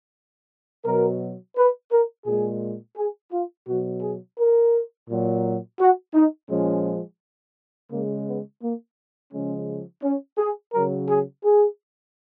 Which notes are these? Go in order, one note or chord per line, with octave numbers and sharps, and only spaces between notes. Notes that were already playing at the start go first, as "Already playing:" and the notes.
B2 F#3 A#4
B4
A#4
A#2 G#3 G#4
G#4
F4
B2 F#3 F#4
G#4
A#4
A#2 F#3
F#4
D#4
A#2 F3 G#3 C#4
C#3 G#3 A#3
B3
A#3
C#3 F3 G#3 C#4
C#4
G#4
C#3 F#3 A#4
G#4
G#4